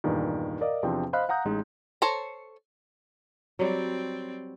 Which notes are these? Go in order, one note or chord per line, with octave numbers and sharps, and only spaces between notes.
E2 G2 A#2 D#3
A#4 D5 D#5 F5
E2 C3 F3 C4 D4 G5
C5 D#5 F5 B5 F#6
F5 F#5 A#5 D#6 G6
A1 G#3 D#4
A4 C5 C#5 A#5
F#3 G3 C4 D5